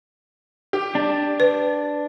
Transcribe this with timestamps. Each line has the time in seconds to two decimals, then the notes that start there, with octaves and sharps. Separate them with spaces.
0.73 G4
0.95 D4
1.40 B4